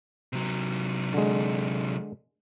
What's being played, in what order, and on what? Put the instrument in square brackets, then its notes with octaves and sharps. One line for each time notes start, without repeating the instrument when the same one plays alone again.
[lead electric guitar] C3 F#3
[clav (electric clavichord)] D3 G#3